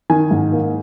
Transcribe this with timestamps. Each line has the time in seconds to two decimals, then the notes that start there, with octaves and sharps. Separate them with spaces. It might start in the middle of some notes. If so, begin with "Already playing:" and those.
0.10 D#3 G#5
0.31 G#2
0.52 A#3